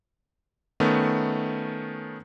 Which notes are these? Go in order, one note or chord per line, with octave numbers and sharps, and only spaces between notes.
D#3 A3 B3 C#4